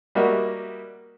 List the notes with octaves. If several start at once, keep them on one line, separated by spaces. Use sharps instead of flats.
G3 A#3 F#4 A#4 D#5 E5